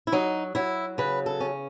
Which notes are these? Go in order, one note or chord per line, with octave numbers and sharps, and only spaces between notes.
E4
F#3 D#4
F#3 E4
C#3 B4
A4
C#4